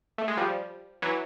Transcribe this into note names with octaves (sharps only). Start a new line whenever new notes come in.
A3
G#3
F3 G3
E3 F#3